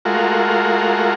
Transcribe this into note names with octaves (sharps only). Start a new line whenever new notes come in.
G#3 A3 F4 F#4 A#4